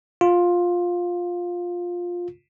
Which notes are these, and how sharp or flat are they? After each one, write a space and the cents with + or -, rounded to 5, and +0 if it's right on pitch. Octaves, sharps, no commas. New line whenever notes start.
F4 +10